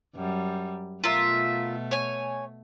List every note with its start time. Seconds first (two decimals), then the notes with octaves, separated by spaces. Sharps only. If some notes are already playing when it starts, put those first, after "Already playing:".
0.16 F#2 G3
1.04 B2 A3 F4 A#4 E5
1.91 C#5 G#5